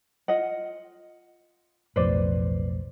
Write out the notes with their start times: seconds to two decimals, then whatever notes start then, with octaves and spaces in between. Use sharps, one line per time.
0.28 F4 D#5 F#5
1.96 B1 F2 A2 B4 C5 D5